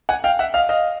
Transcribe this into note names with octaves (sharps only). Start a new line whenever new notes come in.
F#5 G#5
F5 G5
E5 F#5
D#5 F5
D#5 F5